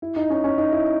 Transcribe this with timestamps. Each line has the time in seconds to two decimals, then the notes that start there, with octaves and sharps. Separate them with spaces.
0.02 E4
0.16 D#4
0.30 C#4
0.44 C#4
0.58 D#4
0.72 E4